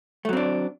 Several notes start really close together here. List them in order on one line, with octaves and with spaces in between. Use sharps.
A3 F#3 C4 D4